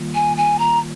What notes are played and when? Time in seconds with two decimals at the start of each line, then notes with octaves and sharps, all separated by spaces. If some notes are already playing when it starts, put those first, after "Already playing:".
Already playing: D#3 G3 A#3 F4
0.15 G#5
0.37 G#5
0.59 A#5